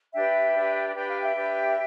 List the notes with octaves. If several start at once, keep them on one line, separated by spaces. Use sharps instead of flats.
D4 G4 B4 E5 G5
D4 G4 B4
D4 G4 B4 G5
F5
E5 G5
D4 G4 B4